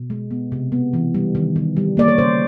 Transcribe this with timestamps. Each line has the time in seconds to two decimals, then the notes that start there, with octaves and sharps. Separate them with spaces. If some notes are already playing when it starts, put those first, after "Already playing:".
Already playing: B2
0.10 G#3
0.31 B3
0.52 C3
0.72 B3
0.93 E3
1.14 G3
1.35 D#3
1.56 D#3
1.77 G3
1.97 A#3 D5
2.08 C#5
2.18 C#3 C5